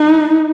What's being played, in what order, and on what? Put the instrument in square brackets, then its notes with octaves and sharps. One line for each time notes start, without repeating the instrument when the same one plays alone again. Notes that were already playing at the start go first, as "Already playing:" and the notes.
Already playing: [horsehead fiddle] D#4